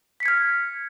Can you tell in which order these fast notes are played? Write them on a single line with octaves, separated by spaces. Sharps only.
B6 C#7 G#6 F6